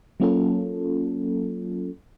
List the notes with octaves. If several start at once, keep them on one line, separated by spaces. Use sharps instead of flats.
F#3 A#3 C#4 F4 A4